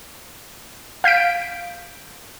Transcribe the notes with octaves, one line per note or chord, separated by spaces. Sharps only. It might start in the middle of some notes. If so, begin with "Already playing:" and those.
F5 G6 B6 D7